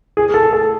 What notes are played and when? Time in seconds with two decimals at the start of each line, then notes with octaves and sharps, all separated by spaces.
0.17 G#4
0.34 A4
0.53 A4